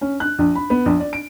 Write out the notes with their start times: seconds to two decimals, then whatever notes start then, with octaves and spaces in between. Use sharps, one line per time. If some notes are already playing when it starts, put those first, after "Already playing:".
0.01 C#4
0.20 F#6
0.39 A#1
0.55 B5
0.70 B3
0.86 A#1
1.00 D5
1.13 D7